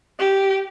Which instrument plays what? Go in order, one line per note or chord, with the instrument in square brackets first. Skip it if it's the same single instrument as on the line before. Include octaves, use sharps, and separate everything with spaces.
[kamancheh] G4